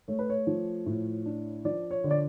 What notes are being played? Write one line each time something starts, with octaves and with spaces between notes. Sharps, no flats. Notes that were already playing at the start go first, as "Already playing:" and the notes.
A3 C#5
B4
C#5
F3
A2
D4
F3 D5
C#5
D3
D5